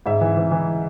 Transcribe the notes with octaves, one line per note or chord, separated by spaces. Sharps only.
G#2 E5
E3
E3
E3